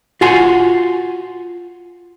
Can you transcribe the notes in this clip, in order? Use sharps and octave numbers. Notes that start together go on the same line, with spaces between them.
F4 F#4 G#5 C6